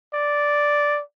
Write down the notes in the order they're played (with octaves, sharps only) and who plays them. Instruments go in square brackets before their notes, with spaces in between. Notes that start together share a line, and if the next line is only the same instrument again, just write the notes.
[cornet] D5